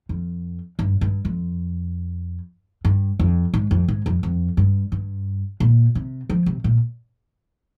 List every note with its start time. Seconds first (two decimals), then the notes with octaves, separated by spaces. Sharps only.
0.09 F2
0.79 G2
1.01 G2
1.25 F2
2.85 G2
3.19 F2
3.54 G#2
3.71 F2
3.88 G#2
4.06 F2
4.23 F2
4.57 G2
4.92 G2
5.60 A#2
5.95 C3
6.29 F3
6.46 C3
6.64 A#2